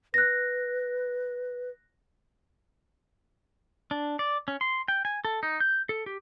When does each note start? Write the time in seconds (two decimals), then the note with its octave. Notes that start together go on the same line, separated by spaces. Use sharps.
0.14 B4 F#6 A#6
3.91 D4
4.19 D5
4.48 C#4
4.61 C6
4.88 G5
5.05 G#5
5.25 A4
5.43 D#4
5.60 G6
5.89 A4
6.06 G4